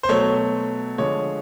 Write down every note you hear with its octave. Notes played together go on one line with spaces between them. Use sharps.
C5
B2 F#3 A3 C#5
D3 F3 G#3 C#5